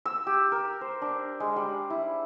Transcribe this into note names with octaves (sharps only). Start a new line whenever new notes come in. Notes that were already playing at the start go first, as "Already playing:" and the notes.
E6
G4
A#4
C5
D4
G#3
G3
E4